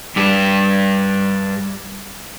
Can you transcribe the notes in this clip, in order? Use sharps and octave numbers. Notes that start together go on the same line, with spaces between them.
G2 G4